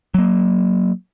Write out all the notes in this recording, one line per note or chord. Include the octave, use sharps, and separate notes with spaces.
F#3 A#3